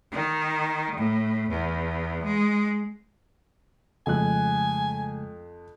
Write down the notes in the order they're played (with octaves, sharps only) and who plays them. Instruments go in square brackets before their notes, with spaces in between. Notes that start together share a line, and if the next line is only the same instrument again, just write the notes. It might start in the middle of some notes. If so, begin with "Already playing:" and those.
[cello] D#3
A2
E2
G#3
[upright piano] F2 F#6 [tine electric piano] C#3 G#3 A3 [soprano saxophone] G#5